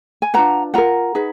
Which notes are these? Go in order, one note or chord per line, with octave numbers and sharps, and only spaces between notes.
G#5
D4 F4 B4 F#5 A#5
F4 A#4 F#5 A#5
D#4 G#4 B4